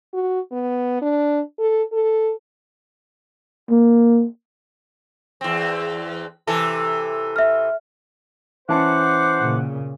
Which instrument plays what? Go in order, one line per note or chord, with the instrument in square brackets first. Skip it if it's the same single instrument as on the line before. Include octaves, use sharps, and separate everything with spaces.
[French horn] F#4
B3
D4
A4
A4
[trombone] A#3
[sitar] E2 C4
C3 E3 A4
[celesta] E5 F6
[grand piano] E3 C#4 A5 [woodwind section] C5 F#5 [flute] D6
[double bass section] A#2 C#3